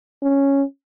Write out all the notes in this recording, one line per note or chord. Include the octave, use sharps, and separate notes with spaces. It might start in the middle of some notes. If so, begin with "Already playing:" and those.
C#4